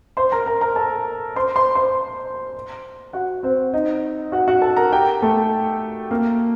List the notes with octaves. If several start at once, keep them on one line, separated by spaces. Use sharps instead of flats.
C5 C6
A#4 A#5
A#4 A#5
A#4 A#5
A4 A5
C5 C6
C5 C6
C5 C6
F#4 F#5
C4 C5
D#4 D#5
F#4 F#5
F#4 F#5
A4 A5
A#4 A#5
G4 G5
A3 A4
A#3 A#4